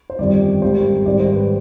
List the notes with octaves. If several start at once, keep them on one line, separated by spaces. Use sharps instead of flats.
C5
G1 F2 D#3 G3 D5
G#1 G#2 G3 C5
G#1 G#2 D#3 G3 D5
C5
B4